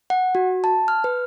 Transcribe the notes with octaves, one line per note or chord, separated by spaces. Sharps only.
F#5
F#4
A5
F6
B4